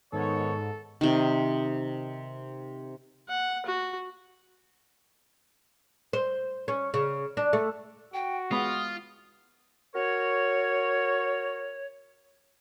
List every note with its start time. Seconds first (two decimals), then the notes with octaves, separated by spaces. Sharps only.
0.13 G#2 D#3 B3 A4 C#5
1.01 C3 D#3
3.29 F#5
3.66 F#4
6.13 C5
6.68 C#4
6.94 C#3
7.37 D4
7.53 A3
8.14 F#4 G5
8.51 G#3 B3 F4 B5 D#6
9.94 F#4 A#4 C#5